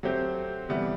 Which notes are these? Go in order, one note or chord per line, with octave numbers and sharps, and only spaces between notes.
F#3 A3 C4 G4 C5
C3 E3 G3 B3